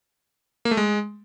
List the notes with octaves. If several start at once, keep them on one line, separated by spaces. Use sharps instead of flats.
A#3
A3
G#3